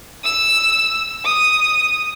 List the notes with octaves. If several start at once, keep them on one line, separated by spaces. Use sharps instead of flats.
E6
D#6